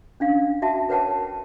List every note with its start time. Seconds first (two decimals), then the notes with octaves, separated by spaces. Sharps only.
0.20 C#4 D4 F5
0.62 F#4 E5 G5 A5
0.89 A#4 B4 C#5 F#5 G5 A5